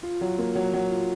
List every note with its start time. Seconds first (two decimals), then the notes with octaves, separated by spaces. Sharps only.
0.03 F4
0.21 F#3
0.38 A#3
0.55 F#3
0.74 F#3
0.91 F4